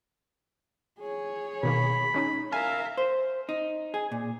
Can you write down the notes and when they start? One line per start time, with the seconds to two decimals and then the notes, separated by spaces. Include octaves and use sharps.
0.99 G#4 C#5
1.63 B2 D#3 A#3 B5
2.14 G#3 C#4 D#4
2.52 A#4 E5 F5 G#5
2.97 C5
3.49 D#4
3.94 G#4
4.12 A#2